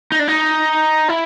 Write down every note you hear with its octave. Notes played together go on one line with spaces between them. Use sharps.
D#4
D4
D#4
E4